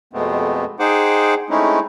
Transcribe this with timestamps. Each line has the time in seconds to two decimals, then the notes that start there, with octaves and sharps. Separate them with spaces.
0.13 F2 B2 G#3 A3 B3 C4
0.80 D#4 G#4 C5 F#5 G5 D6
1.50 G#3 A3 C4 C#4 D#4 E4